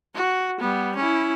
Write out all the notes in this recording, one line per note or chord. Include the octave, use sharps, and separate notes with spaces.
F#4
G3 B3
C#4 E4